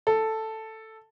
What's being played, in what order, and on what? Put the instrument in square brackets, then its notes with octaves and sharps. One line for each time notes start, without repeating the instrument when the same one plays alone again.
[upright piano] A4